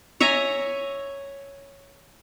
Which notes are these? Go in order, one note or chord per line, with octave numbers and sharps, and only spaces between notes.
C#5 E5 G#5 A#5